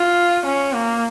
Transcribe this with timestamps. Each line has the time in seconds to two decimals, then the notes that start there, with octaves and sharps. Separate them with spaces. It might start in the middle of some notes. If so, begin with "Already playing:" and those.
Already playing: F4
0.45 C#4
0.74 A#3